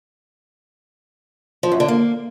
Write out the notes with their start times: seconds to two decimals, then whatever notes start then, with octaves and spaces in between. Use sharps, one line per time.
1.63 F3
1.72 F#2
1.80 D3
1.88 A#3